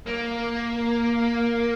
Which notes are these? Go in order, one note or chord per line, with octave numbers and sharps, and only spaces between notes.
A#3